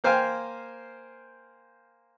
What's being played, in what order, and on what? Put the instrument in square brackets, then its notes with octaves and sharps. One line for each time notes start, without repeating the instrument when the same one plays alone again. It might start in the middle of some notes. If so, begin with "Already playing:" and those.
[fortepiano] A#3 C5 F5 G5 G#5